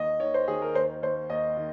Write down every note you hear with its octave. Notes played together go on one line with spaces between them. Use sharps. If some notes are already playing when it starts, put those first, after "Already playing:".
Already playing: D#2 D#3 D#5
D#3 C#5
C5
D#3 G#4
A#4
D#2 C5
D#2 C5
D#2 D#5
D#3